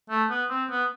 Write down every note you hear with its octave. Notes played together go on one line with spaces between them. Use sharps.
A3
B3
C4
B3